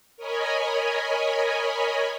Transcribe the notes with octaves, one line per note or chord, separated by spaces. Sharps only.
A#4 C#5 D#5 G#5 B5